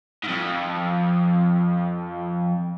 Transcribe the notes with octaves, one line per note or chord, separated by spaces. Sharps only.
F2 G#2